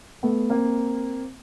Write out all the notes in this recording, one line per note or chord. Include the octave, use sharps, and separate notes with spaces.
A3 B3
A#3 C4